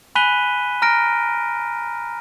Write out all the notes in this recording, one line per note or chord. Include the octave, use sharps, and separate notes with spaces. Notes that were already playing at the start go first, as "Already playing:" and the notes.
G#5 B5 F#6 B6 D#7 G7
A#5 F6 A#6 D7